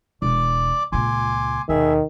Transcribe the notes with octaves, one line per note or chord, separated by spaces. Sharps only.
E1 D5 D6
C#2 A#2 G#5 C6 D6
D#2 B2 D#3 G#4 E5